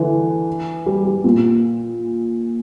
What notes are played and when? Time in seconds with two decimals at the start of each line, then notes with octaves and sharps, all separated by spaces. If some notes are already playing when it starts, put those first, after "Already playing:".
Already playing: D3 E3
0.86 G3
1.05 G3
1.24 A#2